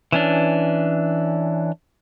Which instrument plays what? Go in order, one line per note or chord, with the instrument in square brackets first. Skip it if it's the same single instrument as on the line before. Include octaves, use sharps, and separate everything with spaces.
[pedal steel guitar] E3 C#4 D4